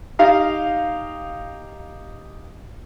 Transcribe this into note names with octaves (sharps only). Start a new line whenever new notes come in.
D#4 G4 F5 A#5